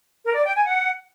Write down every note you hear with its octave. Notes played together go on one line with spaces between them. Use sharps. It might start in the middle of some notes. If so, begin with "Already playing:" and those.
A#4
D5
G5
G#5
F#5